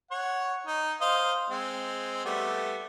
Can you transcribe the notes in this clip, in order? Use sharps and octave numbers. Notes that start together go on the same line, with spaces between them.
C#5 F#5
D#4
C5 D#5 F5
G#3 C4
G3 A3 B3